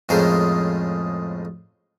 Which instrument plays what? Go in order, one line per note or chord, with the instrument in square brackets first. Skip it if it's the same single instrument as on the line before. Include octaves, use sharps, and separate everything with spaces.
[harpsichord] F2 A2 C#3 G#3 A#4 C5